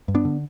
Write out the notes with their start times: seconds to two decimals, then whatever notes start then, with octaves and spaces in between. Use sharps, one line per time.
0.08 G2
0.15 B3 D4
0.25 D3